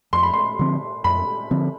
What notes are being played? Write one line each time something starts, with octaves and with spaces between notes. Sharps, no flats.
F2 C6
B5
C6
D3 F3 C4
F2 B5
D3 F3 C4